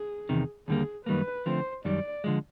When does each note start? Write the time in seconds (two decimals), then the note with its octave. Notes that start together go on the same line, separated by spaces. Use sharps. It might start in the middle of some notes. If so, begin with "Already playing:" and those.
Already playing: G#4
0.29 E2 C3 D#3
0.68 D#2 D3 G3 A#3 G#4
1.06 F#2 D#3 G3 A#3 B4
1.46 D3 F3 A3 C4 C5
1.85 F#2 D#3 G3 D5
2.24 D3 F3 G#3